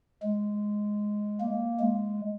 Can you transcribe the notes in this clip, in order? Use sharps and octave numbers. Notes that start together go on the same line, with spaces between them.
G#3
A#3
G#3